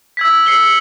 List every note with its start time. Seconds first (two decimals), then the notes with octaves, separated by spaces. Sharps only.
0.17 E6 G#6 B6
0.46 E6 C7 C#7 F#7 G7